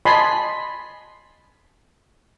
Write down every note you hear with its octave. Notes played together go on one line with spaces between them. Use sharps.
D#5 G#5 A5 B5 C6